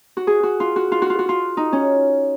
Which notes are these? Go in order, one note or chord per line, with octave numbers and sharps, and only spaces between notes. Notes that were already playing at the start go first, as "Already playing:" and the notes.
F#4
G#4
F#4
F4
F#4
F4
F#4
F4
F#4
F4
D#4
C#4